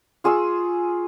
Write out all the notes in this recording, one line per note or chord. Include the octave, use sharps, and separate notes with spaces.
F4 G#4 C#6 E6